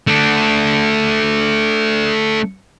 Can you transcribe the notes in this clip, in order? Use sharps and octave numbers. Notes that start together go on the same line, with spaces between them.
A3 D4